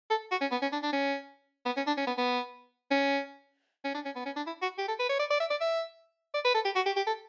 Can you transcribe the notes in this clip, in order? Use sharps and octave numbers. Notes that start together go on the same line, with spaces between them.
A4
F#4
C#4
B3
C#4
D4
D4
C#4
B3
C#4
D4
C#4
B3
B3
C#4
C#4
D4
C#4
B3
C#4
D4
E4
F#4
G4
A4
B4
C#5
D5
D5
E5
D5
E5
D5
B4
A4
G4
F#4
G4
G4
A4